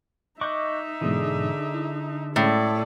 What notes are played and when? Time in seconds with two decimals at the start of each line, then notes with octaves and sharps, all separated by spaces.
0.41 D#4 D#5 E5 C#6 D6 F#6 G6
1.01 G#2 B2 D3 E3 G#4
1.74 E4
2.36 A2 G#3 C#4 A4 D5 B5